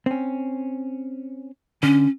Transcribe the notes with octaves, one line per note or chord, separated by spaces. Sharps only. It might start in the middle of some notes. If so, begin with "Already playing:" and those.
C4 C#4
D3 C#4